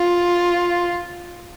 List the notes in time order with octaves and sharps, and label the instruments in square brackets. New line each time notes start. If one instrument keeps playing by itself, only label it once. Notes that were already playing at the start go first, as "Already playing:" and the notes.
Already playing: [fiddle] F4